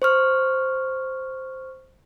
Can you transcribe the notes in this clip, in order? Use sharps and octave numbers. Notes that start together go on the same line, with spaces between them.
C5 C#6 F6